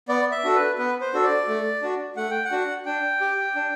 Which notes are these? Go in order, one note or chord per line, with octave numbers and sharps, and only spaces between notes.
B3 D5
E5
D4 F#4 A4
B4
B3 B4
C5
D4 F#4 A4
D5
A3
D4 F#4
A3 F#5
G5
F#5
D4 F#4
D4 G5
G4
D4